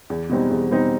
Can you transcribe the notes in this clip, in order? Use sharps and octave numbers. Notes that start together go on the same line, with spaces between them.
E2
B2 G3 C4 D#4
E2
B2 G3 C4 D#4